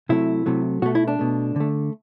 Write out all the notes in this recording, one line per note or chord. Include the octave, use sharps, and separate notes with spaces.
C3 F#3 A3 E4
C3 F#3 A3
B2 A3 F#4
E4
D4
B2 A3
D3 A3